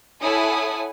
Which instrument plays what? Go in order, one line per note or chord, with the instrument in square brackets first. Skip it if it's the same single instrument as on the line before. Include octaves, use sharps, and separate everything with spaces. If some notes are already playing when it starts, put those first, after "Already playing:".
[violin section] E4 A4 C#5 F#5 G#5 D#6